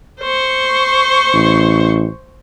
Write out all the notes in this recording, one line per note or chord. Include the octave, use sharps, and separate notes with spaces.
C5 C#6
A1